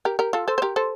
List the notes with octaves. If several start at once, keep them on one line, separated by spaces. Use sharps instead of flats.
G4 A#4
G4 A#4
F4 A4
A4 C5
C5
G4 A#4
A4 C5